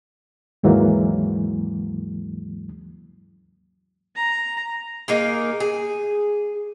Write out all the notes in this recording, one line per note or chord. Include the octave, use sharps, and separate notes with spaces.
D#2 G#2 E3 F#3 G#3 A#3
A#5
A#3 D#4 G#4 A#4
G#4